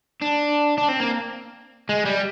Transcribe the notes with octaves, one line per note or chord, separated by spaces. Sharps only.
D4
D4
C4
A#3
G#3
G3